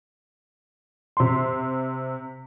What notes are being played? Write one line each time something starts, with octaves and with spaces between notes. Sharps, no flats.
C3 C6